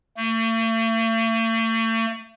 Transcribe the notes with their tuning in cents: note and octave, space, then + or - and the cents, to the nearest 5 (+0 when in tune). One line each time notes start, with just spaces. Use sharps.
A3 +45